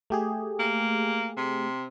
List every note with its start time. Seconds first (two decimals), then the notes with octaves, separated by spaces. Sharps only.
0.10 A3 G4 G#4
0.59 A#3
1.37 C3